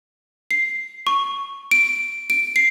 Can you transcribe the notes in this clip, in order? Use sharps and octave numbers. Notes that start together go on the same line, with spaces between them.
C7
C#6
D7
D7
C7